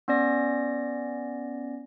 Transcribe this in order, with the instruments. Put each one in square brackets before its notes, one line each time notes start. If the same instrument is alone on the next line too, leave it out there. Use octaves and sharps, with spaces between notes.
[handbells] B3 C#4 D5 A#6